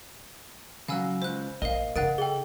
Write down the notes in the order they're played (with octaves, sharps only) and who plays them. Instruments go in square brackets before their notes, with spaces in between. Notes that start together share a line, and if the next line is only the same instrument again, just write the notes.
[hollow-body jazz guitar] C#3 F#3 [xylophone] F5 G#5 E6
[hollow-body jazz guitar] C#2 [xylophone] C5 F#6
[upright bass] A#1 [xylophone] A#4 F5 [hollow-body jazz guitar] D#5
[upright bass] C#3 D#4 [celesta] A#4 F#5 [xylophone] F#6 A6 D7
[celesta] G#4 G5 [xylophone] A4 G7